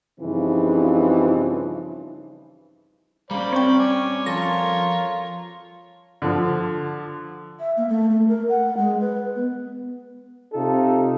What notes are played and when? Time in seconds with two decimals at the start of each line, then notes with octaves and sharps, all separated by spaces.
0.20 G2 C#3 E3 F3 C4 D#4
3.31 G3 A#3 C#4 C5 D5 B5
3.53 C4 C#5 G5
3.79 C#5 D5 G#5
4.26 F3 F4 A4 A#4 C#5 A#6
6.22 D3 F3
7.60 E5
7.77 A#3
7.89 A3
8.10 A3
8.28 A#4
8.49 F#5
8.77 G#3
9.00 B4
9.35 B3
10.54 C3 D#4 F4 A4